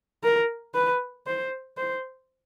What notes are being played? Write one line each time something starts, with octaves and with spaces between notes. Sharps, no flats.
A#4
B4
C5
C5